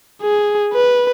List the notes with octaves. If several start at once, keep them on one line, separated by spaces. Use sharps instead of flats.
G#4
B4